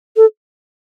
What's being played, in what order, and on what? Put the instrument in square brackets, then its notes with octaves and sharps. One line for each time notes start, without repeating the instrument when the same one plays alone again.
[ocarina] A4